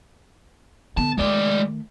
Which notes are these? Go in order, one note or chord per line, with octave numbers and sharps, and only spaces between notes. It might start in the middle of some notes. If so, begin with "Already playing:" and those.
D3 B3 A5
D#3 G#3 A3 D5